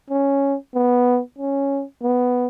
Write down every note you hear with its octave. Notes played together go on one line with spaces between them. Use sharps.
C#4
B3
C#4
B3